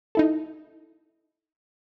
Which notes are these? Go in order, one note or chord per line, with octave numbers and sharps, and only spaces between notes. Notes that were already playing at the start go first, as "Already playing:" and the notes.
D#4 E4 A4